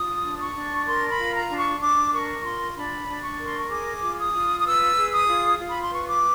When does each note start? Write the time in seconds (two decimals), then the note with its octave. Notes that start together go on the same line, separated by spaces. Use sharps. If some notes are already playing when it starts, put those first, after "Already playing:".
Already playing: F4 D#6
0.22 D4
0.39 C#6
0.54 D4
0.85 A#4 C6
1.09 B5
1.17 F4
1.34 A#5
1.49 D4
1.57 C#6
1.80 D4 D6
2.11 A#4 C#6
2.43 F4 C6
2.75 D4 B5
3.06 D4
3.22 C#6
3.38 A#4
3.44 C6
3.57 C#6
3.69 G#4 D6
4.01 F4
4.17 D#6
4.33 F4
4.58 D#6
4.63 B4 E6
4.95 G#4
5.11 D#6
5.26 F4
5.59 F4
5.68 B5
5.81 C6
5.90 B4 C#6
6.06 D6